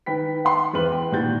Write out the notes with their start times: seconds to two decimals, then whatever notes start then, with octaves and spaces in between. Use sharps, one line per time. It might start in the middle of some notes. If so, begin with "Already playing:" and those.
0.06 D#3 B4 G5 B5 B6
0.45 F#5 G5 C6
0.73 E2 C4 B4 F6 F#7
0.92 G5
1.12 A#2 D#3 F#4 G6 A6